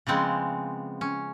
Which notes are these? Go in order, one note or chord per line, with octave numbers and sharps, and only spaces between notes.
C#3 F3 G#3 B3 C4
C#4